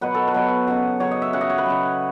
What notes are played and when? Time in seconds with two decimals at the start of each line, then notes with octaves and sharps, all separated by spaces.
0.01 B2 F#3 B4
0.15 A4
0.28 B4
0.34 B2 F#3
0.67 C#3 F#3
1.00 C#3 F#3 C#5
1.11 D#5
1.22 E5
1.33 C#3 F#3 F#5
1.41 D#5
1.50 C#5
1.58 B4
1.66 C#3 F#3